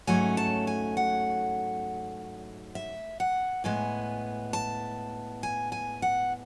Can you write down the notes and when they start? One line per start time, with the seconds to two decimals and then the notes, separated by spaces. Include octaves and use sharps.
0.07 G#2 F#3 A3 C#4 G#5
0.37 A5
0.67 G#5
0.97 F#5
2.75 E5
3.20 F#5
3.64 A2 G#3 B3 G#5
4.53 A5
5.43 G#5
5.72 G#5
6.02 F#5